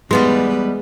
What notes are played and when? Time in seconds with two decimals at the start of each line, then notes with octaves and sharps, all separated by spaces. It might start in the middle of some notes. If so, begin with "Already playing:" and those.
0.11 E2 G3 G#3 B3 D#4 B4